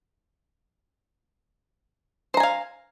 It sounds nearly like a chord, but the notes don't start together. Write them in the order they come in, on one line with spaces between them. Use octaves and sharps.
C5 A#5 G#5 F5